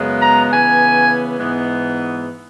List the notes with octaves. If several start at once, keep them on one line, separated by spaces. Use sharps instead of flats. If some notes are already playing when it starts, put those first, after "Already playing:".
Already playing: F#2 C#3 G#3 B3
A#5
C#3 E3 B3 G#5
G#2 E3 G#3 B3